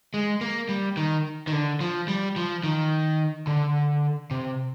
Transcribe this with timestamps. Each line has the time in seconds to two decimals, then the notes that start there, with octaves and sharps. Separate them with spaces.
0.14 G#3
0.41 A#3
0.69 G3
0.97 D#3
1.47 D#3
1.52 D3
1.81 F3
2.08 G3
2.36 F3
2.64 D#3
3.47 D3
4.31 C3